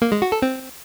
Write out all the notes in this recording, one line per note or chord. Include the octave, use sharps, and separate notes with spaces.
A#3
G#3
F#4
A4
C4